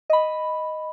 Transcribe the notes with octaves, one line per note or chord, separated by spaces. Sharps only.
D#5 B5